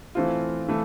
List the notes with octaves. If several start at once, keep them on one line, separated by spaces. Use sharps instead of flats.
E3 A3 C4 F4
E3 A3